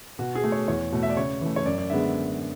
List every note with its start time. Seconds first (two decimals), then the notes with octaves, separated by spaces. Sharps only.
0.19 B2 F#4
0.35 G#4
0.44 A3
0.52 C#5
0.68 E2 C#5
0.92 B2 A3
1.03 E5
1.10 D5
1.17 C#3 C#5
1.41 E3 A3
1.56 C#5
1.66 F#2 D5
1.78 D5
1.90 D3 G#3 B3 E5